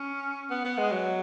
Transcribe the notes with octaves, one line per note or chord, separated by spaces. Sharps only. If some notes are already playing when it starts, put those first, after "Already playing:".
Already playing: C#4
B3
B3
G#3
F#3